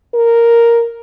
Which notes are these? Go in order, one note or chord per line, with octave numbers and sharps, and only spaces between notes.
A#4